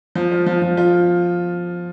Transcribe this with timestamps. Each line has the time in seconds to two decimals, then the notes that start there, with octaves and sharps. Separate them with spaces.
0.15 F3
0.31 F4
0.46 F3
0.62 F3
0.77 F4